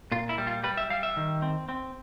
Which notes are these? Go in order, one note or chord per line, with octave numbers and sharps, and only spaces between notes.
A#2 F4
E4
G3
F4
G3 B4
E5
G3 F5
E5
D#3
C4
C4